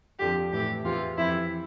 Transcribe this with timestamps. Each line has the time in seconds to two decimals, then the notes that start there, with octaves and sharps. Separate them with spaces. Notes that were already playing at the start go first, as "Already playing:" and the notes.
0.19 F2 D3 F3 G4
0.52 A2 E3 G4
0.84 E2 C3 E3 F4
1.17 F2 C3 E3 E4